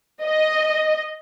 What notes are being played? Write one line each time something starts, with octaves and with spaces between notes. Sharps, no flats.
D#5